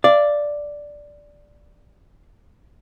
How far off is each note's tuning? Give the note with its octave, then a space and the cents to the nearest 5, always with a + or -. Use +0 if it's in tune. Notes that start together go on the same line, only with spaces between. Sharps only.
D5 +0 F5 -30